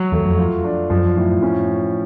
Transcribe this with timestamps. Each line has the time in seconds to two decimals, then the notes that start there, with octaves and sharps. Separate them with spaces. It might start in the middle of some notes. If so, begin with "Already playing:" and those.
Already playing: F#3
0.12 E2 A3
0.26 F2
0.38 F4
0.64 D4
0.90 F#2 F3
1.17 A2
1.43 C#4